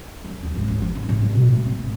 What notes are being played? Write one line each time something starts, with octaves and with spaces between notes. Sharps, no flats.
F#2
D#2
G#1
A1
F3
D#4
A2
G3
B2
A3
C4
G#1